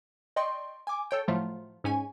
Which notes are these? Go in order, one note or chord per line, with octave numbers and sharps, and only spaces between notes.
D5 D#5 G5 C6 C#6
G#5 D6
A4 C#5 G5
A2 F3 F#3 A3 F4
G#2 C#4 G#5